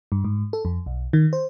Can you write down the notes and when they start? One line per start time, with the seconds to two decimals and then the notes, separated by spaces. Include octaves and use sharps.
0.12 G2
0.25 G#2
0.53 A4
0.65 F2
0.86 B1
1.13 D#3
1.33 C5